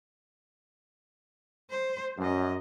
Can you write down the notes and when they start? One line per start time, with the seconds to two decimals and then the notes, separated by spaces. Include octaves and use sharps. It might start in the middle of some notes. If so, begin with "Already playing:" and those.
1.71 C5
2.18 F#2 F#3 D#5